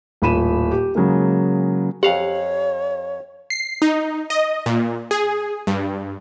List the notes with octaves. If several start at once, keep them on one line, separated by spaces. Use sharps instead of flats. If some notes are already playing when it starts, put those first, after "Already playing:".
D#1 A2 B5 D#7 E7
G4
C#3 F#3 G#3 A#3
F2 G4 C#5 F5 F#5
C7
D#4
D#5
A#2
G#4
G2